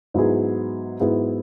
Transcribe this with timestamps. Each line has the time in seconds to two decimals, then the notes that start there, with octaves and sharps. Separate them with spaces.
0.14 G#2 F#3 B3 E4 G#4
1.00 G#2 F#3 B3 E4 G#4